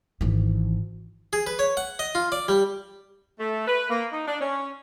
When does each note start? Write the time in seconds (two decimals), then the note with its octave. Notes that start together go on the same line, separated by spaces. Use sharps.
0.21 G#1 E3
1.33 G#4
1.47 B4
1.59 C#5
1.77 F#5
1.99 D#5
2.15 F4
2.32 D5
2.48 G3
3.40 A3
3.67 B4
3.90 A#3
4.12 D#4
4.27 D4
4.41 C#4